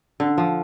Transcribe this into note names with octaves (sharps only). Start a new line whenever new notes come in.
D3
F3